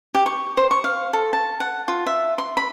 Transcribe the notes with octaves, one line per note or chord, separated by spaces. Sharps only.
G4
C#6
C5
C#6
F5
A4
A5
F#5
F4
E5
C6
B5